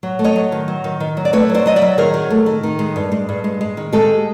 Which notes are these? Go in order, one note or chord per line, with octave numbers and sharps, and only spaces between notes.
F#3
A3
C#5 D#5
F#3
D#3
F#3
D#3
D#3
F#3
D5
A3 B4 C#5
F#3
C5 D5
F#3 D#5
D5 E5
F#3
D#3 G#4 A#4
F#3
A3
D#3
D#3
G#3
G2
G#3
G2
G#3
G#3
D#3
G#3 G4 A4